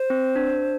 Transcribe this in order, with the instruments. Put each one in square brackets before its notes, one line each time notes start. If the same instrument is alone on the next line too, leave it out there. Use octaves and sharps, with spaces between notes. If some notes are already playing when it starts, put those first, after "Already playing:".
Already playing: [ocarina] C5
[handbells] C4
D4